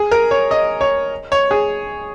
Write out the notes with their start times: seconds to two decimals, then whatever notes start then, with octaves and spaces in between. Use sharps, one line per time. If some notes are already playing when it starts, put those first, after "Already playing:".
Already playing: G#4
0.11 A#4
0.31 C#5
0.51 D#5
0.81 C#5
1.32 C#5
1.51 G#4